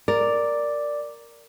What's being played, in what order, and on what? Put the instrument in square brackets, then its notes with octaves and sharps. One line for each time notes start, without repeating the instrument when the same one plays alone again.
[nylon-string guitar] A#4 [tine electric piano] D5